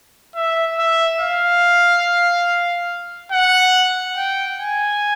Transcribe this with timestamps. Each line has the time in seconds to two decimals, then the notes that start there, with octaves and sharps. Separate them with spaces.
0.36 E5
0.79 E5
1.21 F5
3.32 F#5
4.17 G5
4.59 G#5